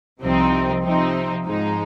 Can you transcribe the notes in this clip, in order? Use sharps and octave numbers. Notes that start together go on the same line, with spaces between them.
C2 C3 F3 C4 D#4
C3 F3 C4 D#4
G#2 F3 G#3 D#4